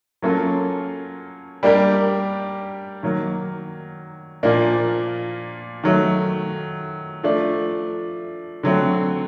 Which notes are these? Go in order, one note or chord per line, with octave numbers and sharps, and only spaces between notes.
F#3 A#3 C#4 F4 A4
G3 A#3 D4 G4 A#4
D#3 F#3 A#3
A#2 F3 A#3 D4
D#3 F#3 A3
F3 A3 D4
D3 F#3 A3 C4